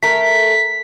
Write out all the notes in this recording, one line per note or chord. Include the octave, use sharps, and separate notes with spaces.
A3 A#4 B6